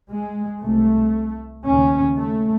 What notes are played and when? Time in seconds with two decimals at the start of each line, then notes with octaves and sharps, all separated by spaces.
0.10 G#3
0.62 C2 C3 A3
1.65 D#2 C#3 C#4
2.16 A3